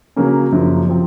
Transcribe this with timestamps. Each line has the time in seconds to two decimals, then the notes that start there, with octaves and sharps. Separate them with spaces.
0.16 C#3 F#3 A#3 C#4
0.52 F#2 C#3 F3 A#3
0.88 C3 F3 C4